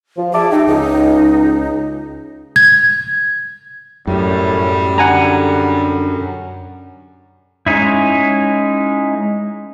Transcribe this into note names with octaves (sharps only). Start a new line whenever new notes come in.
F3
G#4 E5 A5 D6
D#4 G4 E5
C#2 D#4
G#6
F#2 A2 G3
D3 F#5 G#5 A#5
G#3 C#4 D#4 E4